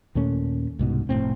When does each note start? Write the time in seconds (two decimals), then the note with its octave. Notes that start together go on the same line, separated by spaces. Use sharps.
0.15 D#2 A#2 A3 C#4
0.79 C2 G#2 B2
1.09 F1 B1 A2 C4